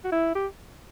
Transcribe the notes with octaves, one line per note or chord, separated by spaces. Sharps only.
F#4
E4
G4